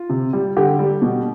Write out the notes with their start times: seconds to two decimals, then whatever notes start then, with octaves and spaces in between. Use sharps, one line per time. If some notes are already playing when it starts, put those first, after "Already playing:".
Already playing: F4
0.10 C3
0.33 G3
0.57 D3 G4
0.79 G3
1.02 B2